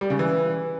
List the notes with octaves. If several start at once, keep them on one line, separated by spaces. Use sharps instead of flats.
G3
C#3
E3